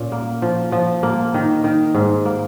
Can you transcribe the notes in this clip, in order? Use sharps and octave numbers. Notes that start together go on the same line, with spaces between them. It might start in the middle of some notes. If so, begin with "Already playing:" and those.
Already playing: A#2 C#4
A#3
F3
F3
A#3
D#3
D#3
G#2
A#3